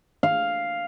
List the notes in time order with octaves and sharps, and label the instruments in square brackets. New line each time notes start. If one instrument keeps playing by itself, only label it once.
[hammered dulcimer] F5